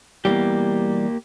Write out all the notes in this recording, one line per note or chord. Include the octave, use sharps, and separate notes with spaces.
B2 E3 G3 A#3 G4